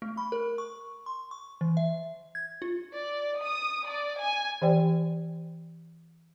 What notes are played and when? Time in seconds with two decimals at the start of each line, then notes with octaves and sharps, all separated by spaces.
0.02 A3
0.17 B5
0.32 A#4
0.58 C#6
1.06 C6
1.31 C#6
1.61 E3
1.77 E5
2.35 G#6
2.62 F4
2.93 D5
3.41 D#6
3.86 D5
4.18 G#5
4.62 E3 G4 C5 D5 G5